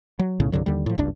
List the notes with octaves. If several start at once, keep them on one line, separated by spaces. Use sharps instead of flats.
F#3
B1 A2 C#3
C2 G2 D3 F#3
D#2 D3 G3
A2 F3
F#1 C#2 G2 D4